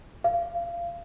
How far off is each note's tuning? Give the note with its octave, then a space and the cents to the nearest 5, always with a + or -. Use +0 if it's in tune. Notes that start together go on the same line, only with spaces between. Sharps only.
F5 -25